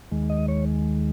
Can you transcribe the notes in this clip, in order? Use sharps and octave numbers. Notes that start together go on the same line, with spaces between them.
D#2 D#3 G#3
D#5
C#5